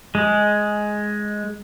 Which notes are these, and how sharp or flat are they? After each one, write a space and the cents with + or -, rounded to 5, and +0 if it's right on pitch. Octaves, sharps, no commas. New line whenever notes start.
G#3 +5